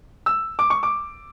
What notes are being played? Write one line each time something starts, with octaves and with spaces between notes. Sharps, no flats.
E6
D6
C#6
D6